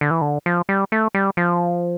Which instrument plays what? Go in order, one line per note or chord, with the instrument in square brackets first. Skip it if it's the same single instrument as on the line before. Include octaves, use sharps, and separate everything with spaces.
[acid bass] D3
E3
D3
F3
G3
A3
G3
F3